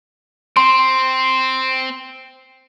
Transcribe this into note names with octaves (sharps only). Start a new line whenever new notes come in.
C4 C6